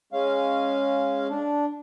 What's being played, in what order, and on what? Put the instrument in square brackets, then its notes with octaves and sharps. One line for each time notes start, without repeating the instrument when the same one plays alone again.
[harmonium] G#3 C#4 F5
D4